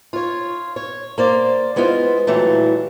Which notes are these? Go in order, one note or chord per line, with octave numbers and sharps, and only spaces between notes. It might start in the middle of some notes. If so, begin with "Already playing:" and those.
F4 C#5
C#5
A#3 C5 D5
G#3 B3 E4 F4 C5
A#2 E3 F#3 G3 A3